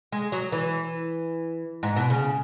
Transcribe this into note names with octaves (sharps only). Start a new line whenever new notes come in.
G#3
F#3
E3
G#2
B2
C#3